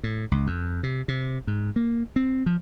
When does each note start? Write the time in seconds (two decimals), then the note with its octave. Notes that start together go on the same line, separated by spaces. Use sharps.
0.04 A2
0.32 C#2
0.47 F2
0.83 C3
1.08 C3
1.47 G#2
1.76 A#3
2.16 C4
2.46 F3